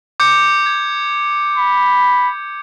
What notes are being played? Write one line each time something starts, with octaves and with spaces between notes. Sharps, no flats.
D6 G6 C#7
G#6
B5